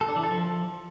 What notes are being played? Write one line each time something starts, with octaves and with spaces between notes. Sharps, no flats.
A4
D4
E3
A4
F3